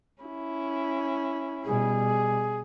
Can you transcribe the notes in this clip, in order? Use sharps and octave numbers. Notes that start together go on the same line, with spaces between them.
C#4 E4
B2 G3 G#4